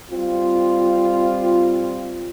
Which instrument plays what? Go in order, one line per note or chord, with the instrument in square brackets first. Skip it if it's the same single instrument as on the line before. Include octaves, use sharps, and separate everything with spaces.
[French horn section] G3 C4 F4